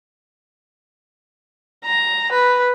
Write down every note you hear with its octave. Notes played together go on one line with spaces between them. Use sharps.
A#5
B4